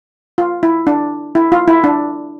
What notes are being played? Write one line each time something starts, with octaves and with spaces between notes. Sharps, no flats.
F4
E4
D4
E4
F4
E4
D4